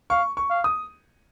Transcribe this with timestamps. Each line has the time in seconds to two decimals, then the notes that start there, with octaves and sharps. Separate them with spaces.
0.10 F5 C#6
0.37 C#6
0.50 F5
0.64 D#6